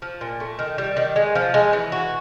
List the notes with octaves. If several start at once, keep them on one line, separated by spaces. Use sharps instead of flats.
F3
A#2
A3
D#3
G3
D#3
G#3
F3
G#3
E3
F#4